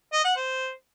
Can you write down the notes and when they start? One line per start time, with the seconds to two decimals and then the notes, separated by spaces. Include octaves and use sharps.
0.13 D#5
0.25 F#5
0.36 C5